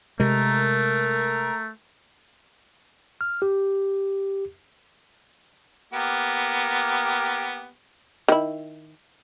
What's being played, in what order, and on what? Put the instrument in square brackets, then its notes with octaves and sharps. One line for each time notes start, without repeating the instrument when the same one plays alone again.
[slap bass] C3 G#3 [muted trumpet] A3 [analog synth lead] A#4
[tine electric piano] F6
G4
[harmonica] A#3 B3 G4
[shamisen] D#3 E4